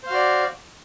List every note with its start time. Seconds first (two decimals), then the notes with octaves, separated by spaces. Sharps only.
0.03 C5
0.07 F5
0.10 F#4
0.14 D5